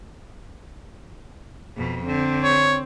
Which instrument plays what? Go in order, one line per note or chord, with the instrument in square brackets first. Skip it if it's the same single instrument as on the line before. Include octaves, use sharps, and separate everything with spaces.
[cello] F2 B2
[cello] D3 [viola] C4
[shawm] C#5